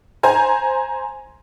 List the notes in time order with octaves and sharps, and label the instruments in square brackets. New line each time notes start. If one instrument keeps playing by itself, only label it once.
[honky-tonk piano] C5 G#5 A#5